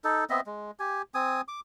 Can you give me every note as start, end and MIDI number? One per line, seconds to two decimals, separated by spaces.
0.04 0.24 63
0.04 0.24 69
0.30 0.41 59
0.30 0.41 60
0.30 0.41 75
0.30 0.41 76
0.46 0.71 56
0.79 1.02 67
0.79 1.02 80
1.14 1.41 60
1.14 1.41 80
1.14 1.41 87
1.48 1.60 86